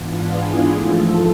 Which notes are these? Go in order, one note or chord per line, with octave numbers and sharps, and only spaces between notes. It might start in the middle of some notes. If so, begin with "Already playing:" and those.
Already playing: G#2 E3 B3 D4 F4
E4 G#4
G#2 F3 A3 F4 A4